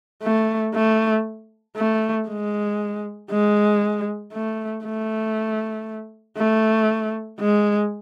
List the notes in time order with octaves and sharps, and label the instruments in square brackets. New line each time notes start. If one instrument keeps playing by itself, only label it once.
[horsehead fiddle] A3
A3
A3
G#3
G#3
A3
A3
A3
G#3